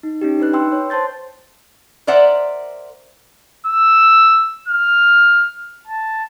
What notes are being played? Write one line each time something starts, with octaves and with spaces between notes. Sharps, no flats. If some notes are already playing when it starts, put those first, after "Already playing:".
D#4
C#4 D#4 G4
D4 D#4 B4 F#6
B4 G5 C6 E6
C#5
C5 A5 C6 G6 A6
A#4 C5 D5 E5 F#5
E6
F6
A5